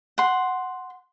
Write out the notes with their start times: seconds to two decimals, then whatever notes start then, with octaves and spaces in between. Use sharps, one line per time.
0.18 F#5 C6